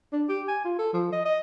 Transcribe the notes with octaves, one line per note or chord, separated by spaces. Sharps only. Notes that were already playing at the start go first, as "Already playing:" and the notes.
D4
G4
G#5
F4
A4
F3
D#5
D#5